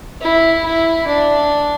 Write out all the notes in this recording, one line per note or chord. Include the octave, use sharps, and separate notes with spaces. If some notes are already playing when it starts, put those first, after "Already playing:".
E4
E4
D4